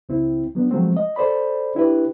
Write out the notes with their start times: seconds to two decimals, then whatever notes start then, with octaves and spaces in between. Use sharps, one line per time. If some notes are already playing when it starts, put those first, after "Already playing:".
0.09 C#2 C4 E4
0.55 F#3 B3 D4
0.71 F3 F#3 G#3 A3 C4
0.97 D#5
1.16 A4 C5 D5 B5
1.75 D4 E4 G4 B4